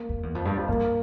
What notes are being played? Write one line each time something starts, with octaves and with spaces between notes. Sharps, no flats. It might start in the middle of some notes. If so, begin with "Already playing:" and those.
Already playing: A#3
F2
E2
F2
G2
F2
G2 A#3